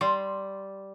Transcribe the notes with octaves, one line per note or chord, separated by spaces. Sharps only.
G3 C6